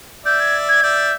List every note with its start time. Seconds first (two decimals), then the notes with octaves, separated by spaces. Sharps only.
0.25 D5 E5 G6
0.39 G#6
0.68 G#6
0.82 D5 E5 G6